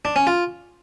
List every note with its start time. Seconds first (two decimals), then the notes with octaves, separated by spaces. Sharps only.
0.05 D4
0.16 C#4
0.27 F4